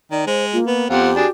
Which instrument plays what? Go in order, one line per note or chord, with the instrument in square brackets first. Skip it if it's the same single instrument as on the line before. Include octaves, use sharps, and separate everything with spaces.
[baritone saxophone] D#3 [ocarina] D5
[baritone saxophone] G#3 [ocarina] C5
[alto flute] A#3 [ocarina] F4
[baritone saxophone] B3 [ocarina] B4
[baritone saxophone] F2 [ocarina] B3 [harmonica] C4 F4 F#5 [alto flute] G4
[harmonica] D4 G#4 [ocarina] F#4